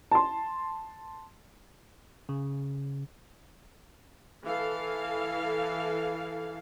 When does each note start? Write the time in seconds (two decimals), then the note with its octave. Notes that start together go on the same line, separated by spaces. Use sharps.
0.11 A5 C6
2.29 C#3
4.44 E3 A4 F5